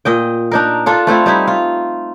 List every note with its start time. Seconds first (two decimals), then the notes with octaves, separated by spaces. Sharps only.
0.05 A#2 D#5 G5
0.51 D4 D#4 A#4
0.86 D4 F4 A4
1.07 A3 C4 E4 F4
1.26 G3 D#4 E4
1.47 F4